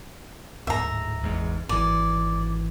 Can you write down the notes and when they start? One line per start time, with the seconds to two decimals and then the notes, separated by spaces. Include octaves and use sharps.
0.67 D1 G#2 E5 A#5
1.22 G#1 E2 G#2
1.69 G#1 E3 D5